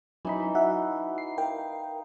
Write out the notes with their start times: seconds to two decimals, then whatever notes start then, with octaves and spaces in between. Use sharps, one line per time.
0.25 E3 F#3 D#4 B5
0.55 F#4 E5 F#5
1.18 C7
1.38 A#4 F5 G5